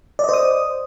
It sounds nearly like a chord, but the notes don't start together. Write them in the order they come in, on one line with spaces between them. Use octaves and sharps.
D5 D#5 C5 D#6